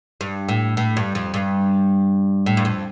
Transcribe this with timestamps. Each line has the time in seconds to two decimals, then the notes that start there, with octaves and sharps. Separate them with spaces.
0.21 G2
0.48 A2
0.77 A2
0.97 G2
1.15 F2
1.34 G2
2.46 A2
2.57 G2
2.65 F2